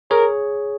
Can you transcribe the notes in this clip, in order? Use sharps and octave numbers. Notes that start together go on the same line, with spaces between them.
G#4 A#4 C#5